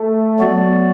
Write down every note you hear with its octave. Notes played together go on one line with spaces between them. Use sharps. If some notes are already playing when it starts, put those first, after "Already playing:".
Already playing: A3
F#3 B3 F#4 D5